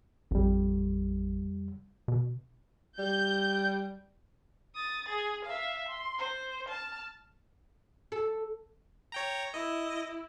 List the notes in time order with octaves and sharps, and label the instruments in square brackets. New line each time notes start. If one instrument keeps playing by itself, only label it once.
[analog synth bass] A1 [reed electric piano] F2 G3
[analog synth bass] B2
[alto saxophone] G3 [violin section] G6
[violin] D#6 A6
G#4
E5 F5
C6
C5
A5 F6
[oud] A4
[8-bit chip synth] C#5 G5 A#5
[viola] E4 [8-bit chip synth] D#5